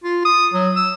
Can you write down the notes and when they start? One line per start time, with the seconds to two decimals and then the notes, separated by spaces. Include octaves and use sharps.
0.04 F4
0.25 D#6
0.54 F#3
0.76 E6